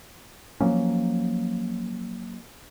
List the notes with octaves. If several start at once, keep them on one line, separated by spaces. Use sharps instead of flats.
F3 F#3 A#3 C#4